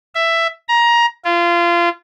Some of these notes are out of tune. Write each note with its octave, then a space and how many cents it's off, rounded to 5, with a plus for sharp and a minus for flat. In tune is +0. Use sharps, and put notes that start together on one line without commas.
E5 +10
A#5 +20
F4 -25